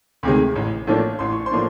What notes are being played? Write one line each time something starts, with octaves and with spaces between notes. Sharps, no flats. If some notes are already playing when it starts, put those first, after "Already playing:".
D2 C3 D#3 G#3
A1
A2 F3 A#3 D4
A1 C6
C#6
C5 C6
A2 F3 A#3 D4